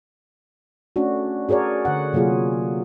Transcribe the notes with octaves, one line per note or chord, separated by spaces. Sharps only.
A3 C#4 D4 F#4
F#4 G#4 A#4 C#5 D5
D3 F#5
C3 F#3 A#3 F4 G#4